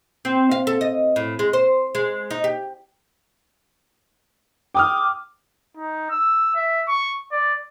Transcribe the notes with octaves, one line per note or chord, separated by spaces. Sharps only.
C4
F5
A4
D#5
A2
G#3
C5
G#3
D#4
G4
G5 D6 D#6 F6
D#4
E6
E5
C#6
D5